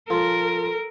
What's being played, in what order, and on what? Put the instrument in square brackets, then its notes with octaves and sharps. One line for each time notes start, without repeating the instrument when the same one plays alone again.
[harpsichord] F3 [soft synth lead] A4 [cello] A#4